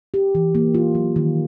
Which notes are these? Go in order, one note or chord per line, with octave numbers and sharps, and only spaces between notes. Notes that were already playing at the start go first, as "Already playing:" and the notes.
G4
E3
A#3
F4
F#3
D#3